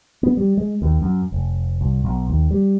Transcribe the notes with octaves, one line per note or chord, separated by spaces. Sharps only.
B3
G3
G#3
D#2
F#2
F1
C2
B1
D#2
G3